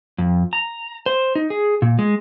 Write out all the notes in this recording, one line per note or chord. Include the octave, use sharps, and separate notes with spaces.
F2
A#5
C5
D#4
G#4
A#2
G#3